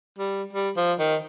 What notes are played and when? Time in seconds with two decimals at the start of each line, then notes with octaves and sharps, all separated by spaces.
0.19 G3
0.53 G3
0.77 F3
0.99 D#3